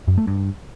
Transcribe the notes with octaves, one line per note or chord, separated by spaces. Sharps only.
F#2
A3
G2